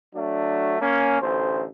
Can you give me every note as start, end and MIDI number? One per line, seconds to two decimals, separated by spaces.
0.15 0.76 54
0.15 0.76 57
0.15 0.76 62
0.81 1.16 58
0.81 1.16 61
1.21 1.64 33
1.21 1.64 38
1.21 1.64 72